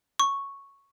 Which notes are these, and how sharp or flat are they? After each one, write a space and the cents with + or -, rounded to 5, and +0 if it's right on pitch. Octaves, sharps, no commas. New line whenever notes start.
C#6 -5